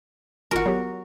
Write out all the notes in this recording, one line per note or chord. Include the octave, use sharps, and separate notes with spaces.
G#1 F4 F#4 A#4 G#5
F#3 B3 G4